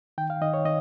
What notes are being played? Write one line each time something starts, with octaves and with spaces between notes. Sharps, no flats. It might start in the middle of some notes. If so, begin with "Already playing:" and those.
D#3 G5
F5
D#3 D#5
C#5
D#3 D#5